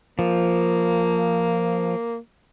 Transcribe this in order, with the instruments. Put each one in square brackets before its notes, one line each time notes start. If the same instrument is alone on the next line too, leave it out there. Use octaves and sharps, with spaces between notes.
[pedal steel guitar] F3 [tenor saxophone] A#3